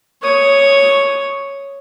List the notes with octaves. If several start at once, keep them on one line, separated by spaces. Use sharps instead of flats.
C#5 D#6